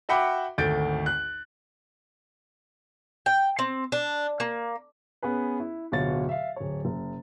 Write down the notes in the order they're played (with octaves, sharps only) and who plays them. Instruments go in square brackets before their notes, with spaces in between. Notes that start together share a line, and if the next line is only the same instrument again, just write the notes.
[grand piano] F#4 E5 F#5 G5 B5 D6
G#1 D2 A3 G6 A6 D7
F#6
[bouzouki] G5
C4
D4
A#3
[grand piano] B3 C#4 G#4 B4
E4
D1 B2 F4 C#5 A6
E5 F5
D1 C#5
F#1